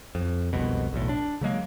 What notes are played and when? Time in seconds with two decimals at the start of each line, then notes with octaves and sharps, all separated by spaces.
0.15 F2
0.53 E1 C2 F2 B2
0.93 B1 E2 A2
1.09 D4
1.41 C#3 F#3 G#3 A#3